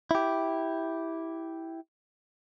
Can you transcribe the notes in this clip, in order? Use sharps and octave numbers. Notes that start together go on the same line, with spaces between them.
E4 G4